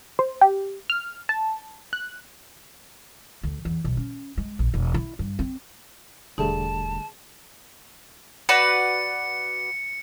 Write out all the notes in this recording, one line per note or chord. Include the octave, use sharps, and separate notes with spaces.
C5
G4
F6
A5
F#6
D2
E2
B1
C#4
G#3
A#1
E1
E4
G2
C4
E1 D3 G3 A3 G#4 A5
F#4 B4 D5 C#7